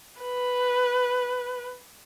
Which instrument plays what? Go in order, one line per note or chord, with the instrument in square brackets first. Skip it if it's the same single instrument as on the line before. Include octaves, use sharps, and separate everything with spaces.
[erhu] B4